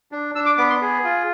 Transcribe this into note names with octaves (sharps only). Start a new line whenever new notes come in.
D4
D4 E6
D6
B3 D6
C6
G#4
F4